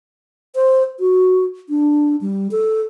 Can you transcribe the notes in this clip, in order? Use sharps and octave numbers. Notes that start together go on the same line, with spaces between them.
C5
F#4
D4
G3
A4